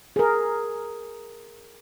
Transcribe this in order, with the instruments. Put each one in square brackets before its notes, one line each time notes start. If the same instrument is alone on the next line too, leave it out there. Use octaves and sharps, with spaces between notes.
[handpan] G#4 A#4